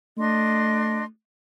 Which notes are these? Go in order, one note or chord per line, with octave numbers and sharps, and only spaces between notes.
A3 D4 D#5 C6